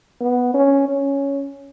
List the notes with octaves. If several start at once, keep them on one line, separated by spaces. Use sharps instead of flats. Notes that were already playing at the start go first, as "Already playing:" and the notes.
B3
C#4
C#4